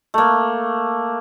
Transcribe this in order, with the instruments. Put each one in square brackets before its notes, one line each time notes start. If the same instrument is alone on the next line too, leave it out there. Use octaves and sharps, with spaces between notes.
[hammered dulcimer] A3 A#3